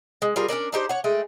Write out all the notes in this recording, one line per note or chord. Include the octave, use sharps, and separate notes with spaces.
G#3
G3 F4 G#4 A#4
C#4 D4 A#4 D5
D4 D#4 G4 C5
C#5 F#5
G#3 A3 G5 G#5